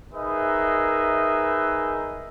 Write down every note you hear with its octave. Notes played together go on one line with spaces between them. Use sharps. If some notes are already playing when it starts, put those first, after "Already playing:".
D#4 G#4 A#4 B4 D#5 E5